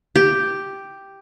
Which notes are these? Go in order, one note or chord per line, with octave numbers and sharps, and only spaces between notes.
G4